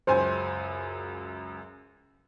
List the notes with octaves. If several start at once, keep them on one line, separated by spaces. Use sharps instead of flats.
C#2 F#2 C5 G#5